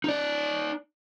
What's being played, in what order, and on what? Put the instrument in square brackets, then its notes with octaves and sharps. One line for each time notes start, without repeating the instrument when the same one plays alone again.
[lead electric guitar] D#4 D5